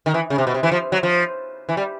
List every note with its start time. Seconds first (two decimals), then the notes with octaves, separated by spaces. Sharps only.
0.06 D#3
0.14 E3
0.30 C#3
0.38 C3
0.47 B2
0.54 C3
0.63 E3
0.72 F3
0.92 F#3
1.03 F3
1.69 E3
1.77 G3